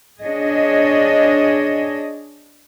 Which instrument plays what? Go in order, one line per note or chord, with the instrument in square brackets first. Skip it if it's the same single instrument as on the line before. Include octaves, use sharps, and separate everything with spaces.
[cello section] D4 G#4 C#5 D#5